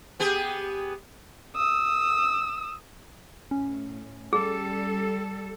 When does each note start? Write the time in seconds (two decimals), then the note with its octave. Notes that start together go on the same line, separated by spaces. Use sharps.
0.20 B3 G4 G#4
1.56 D#6 E6
3.51 A2 C#4
4.33 G3 G#4 A4